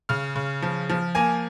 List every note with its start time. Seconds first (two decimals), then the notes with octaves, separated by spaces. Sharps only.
0.09 C#3 F6
0.36 C#3
0.62 F3
0.89 F3
1.15 A#3 G#5